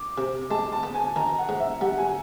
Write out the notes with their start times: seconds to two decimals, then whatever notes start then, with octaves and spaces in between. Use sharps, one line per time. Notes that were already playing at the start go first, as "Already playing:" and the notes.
Already playing: D6
0.18 C3
0.50 G#3 A5
0.72 A5
0.83 B3
0.94 G#5
1.16 D#3 A#5
1.38 F#5
1.49 G#2
1.60 E5
1.81 G3 F#5
1.98 G#5